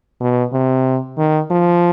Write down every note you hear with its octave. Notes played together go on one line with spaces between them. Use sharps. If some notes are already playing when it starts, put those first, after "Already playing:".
B2
C3
D#3
F3